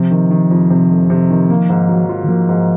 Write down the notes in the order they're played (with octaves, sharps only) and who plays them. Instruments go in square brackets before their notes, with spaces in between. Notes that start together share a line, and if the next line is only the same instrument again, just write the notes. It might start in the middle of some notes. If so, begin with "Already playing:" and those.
Already playing: [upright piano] C3 [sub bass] F3
[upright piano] D#3
D#3
F2
C3
F1
C3
D#3
A#3
G#2
F#3
F4
[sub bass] D#3
[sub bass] F3 [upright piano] A#3
[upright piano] G#2